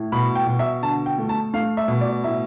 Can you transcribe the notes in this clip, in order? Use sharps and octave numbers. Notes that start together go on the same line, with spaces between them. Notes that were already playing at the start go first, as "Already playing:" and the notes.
Already playing: A2
B2 B5
G5
B2
E5
D3 A5
G5
A3
A5
A3 F5
E5
B2
D5
A2 E5